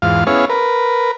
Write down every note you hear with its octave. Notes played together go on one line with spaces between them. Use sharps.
E2 G#2 F4 F5
B3 C#4 E4 G#4 C#5 F5
A#4 B4